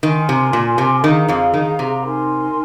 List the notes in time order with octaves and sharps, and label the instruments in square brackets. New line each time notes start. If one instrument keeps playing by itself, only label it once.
[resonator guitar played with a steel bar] D#3 [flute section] A#4 G#5 C6
[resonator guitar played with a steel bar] C3
A#2
C3
[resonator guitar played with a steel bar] D#3 [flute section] G#4 F5 A#5
[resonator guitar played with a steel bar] F2 F3
D#3
C3
[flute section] D#4 A#4 G#5 C6